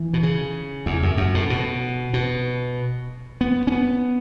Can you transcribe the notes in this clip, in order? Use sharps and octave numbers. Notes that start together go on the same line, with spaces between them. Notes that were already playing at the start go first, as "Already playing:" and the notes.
Already playing: E3
B2
C#3
E2
F#2
F#2
A2
B2
B2
B3
C#4
B3